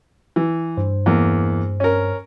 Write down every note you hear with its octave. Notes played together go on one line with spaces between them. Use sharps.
E3
G2 C5
E2 A#3
C#4 A#4